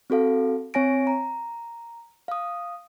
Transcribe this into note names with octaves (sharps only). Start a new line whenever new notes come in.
C4 F#4 A4 F5
C4 C#5 G#5 A#6 D7
A#5
F5 D#6